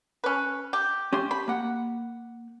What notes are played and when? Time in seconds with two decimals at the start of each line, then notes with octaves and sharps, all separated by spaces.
0.24 C#4 B4
0.73 G4
1.13 C#4 G4 C6
1.31 B5
1.48 A#3 F#5